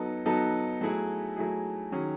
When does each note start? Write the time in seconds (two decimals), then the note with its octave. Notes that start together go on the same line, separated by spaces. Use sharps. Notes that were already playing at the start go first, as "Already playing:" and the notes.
Already playing: F#3 B3 D#4 A4
0.26 F#3 B3 D#4 A4
0.81 F#3 A3 E4 G#4
1.37 F#3 A3 E4 G#4
1.92 D#3 F#3 C#4 G#4